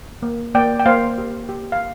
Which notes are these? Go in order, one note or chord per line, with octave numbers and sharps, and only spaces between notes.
A#3
A#3 D5 G5
G5
A#3 C5 F5
G4
G4
F5